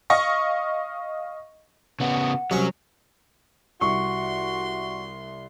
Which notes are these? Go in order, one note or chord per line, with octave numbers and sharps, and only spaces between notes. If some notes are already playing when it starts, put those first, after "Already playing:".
D#5 F5 C#6 A#6
C#3 B3 F#5
C2 F#3 C#4
C2 F#4 C6 C#6